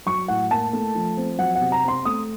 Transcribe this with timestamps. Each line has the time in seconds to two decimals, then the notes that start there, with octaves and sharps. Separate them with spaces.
0.06 F#3 C#6
0.28 A2 F#5
0.51 A#3 A5
0.73 A3
0.95 F3
1.17 C4
1.38 F#3 F#5
1.56 F#5
1.61 C3
1.72 A#5
1.84 C4 C6
2.05 A3 D#6